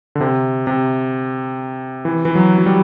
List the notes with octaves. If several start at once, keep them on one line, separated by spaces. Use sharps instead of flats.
D3
C3
C3
E3
E3
F#3
F#3
G3